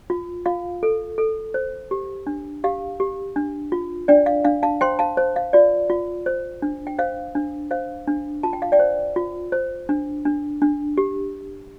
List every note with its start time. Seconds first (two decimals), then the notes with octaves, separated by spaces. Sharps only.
0.10 F4
0.46 F4 F5
0.83 A4
1.18 A4
1.54 C5
1.91 G4
2.27 D4
2.64 G4 F5
3.00 G4
3.36 D4
3.72 F4
4.08 D4 D5 G5
4.26 F5
4.45 D4 F5
4.63 F5 A5
4.81 C5 G5 C6
4.99 F5 A5
5.17 C5
5.36 F5
5.53 F4 D5
5.90 F4
6.26 C5
6.62 D4
6.87 G5
6.99 C5 F5
7.35 D4
7.71 C5 F5
8.07 D4
8.43 F4 A5
8.53 G5
8.62 F5
8.72 D5 G5
8.79 C5
9.16 F4
9.52 C5
9.89 D4
10.25 D4
10.62 D4
10.98 G4